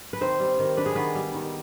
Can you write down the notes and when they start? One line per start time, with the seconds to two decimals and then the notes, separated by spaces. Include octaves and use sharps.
0.13 B4
0.21 D#3 C4 C5
0.40 G3
0.59 D#3
0.77 D4 B4
0.86 G#4
0.95 D#3 B3 B4
1.15 G3
1.34 D#3